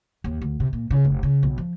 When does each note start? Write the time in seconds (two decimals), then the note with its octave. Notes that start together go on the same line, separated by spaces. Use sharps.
0.24 D#2
0.42 D2
0.60 C3
0.73 A#2
0.91 C#3
1.04 F1
1.23 C#3
1.43 B1
1.58 F3